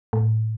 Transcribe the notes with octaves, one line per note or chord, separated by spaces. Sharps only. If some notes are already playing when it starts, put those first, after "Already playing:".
A2